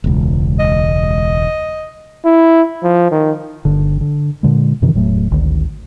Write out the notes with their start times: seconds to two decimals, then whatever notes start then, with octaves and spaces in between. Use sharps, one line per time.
0.04 E1 C#2
0.60 D#5
2.25 E4
2.83 F3
3.12 D#3
3.65 G1 D3
4.01 D3
4.43 A#2 D3 G#3
4.82 F#2 C3 D#3 E3
4.94 E1 A2 F#3 A3
5.31 G#1 D2 D#3